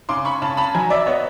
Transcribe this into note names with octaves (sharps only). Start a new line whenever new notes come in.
C#3 C6 D6
B5 C#6
C#3 A5 B5
A5 B5
F#3 G#5 A#5
D5 E5
B3 C#5 D#5